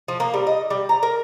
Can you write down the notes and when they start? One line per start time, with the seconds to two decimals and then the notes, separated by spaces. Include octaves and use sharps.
0.08 F3
0.20 A#3
0.34 G3
0.47 D#5
0.70 G3
0.89 A#5
1.03 A#4